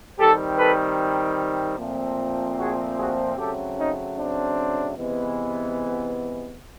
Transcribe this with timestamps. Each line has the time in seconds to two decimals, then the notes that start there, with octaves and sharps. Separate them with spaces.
0.19 D#3 G3 C4 G4 A4
0.59 A4 B4
1.79 A#2 F3 A3 C4
2.59 F#4 G#4
2.98 F#4 G#4
3.38 C#3 F#3 A3 C4 G4 A4
3.78 C#4 D#4
4.18 C4 D4
4.97 C3 E3 G#3 B3